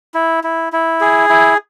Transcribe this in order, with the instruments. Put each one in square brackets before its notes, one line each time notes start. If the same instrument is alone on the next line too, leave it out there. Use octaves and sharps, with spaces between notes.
[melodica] E4
E4
E4
G#4
E4